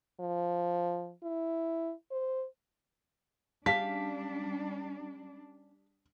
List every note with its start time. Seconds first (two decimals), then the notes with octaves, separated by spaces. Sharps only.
0.20 F3
1.23 E4
2.11 C5
3.66 G3 C#4 D4 G4 F5 A5 B6